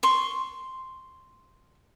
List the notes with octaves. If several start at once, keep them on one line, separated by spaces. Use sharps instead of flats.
C6 C#6